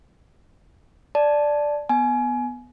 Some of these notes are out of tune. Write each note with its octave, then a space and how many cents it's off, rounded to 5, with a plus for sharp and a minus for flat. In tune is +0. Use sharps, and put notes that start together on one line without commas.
D5 +0 A5 -10
B3 +0 G#5 +25